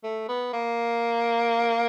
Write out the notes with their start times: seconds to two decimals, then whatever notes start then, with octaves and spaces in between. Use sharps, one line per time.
0.04 A3
0.28 B3
0.53 A#3